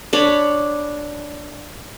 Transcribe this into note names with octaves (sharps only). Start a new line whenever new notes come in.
D4 C#5 B5